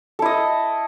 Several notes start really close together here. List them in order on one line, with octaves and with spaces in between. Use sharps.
A4 E4 D#5